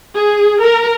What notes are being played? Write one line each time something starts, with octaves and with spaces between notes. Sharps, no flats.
G#4
A#4